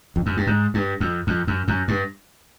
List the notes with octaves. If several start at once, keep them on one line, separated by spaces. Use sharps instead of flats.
F2
F#2
G2
G#2
G2
F2
F2
F#2
F#2
G2